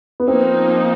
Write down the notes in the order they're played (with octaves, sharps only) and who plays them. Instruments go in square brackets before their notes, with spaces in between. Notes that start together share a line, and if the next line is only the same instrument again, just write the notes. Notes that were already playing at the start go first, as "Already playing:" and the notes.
[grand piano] B3
[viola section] F3 A#3 D#4 [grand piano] C4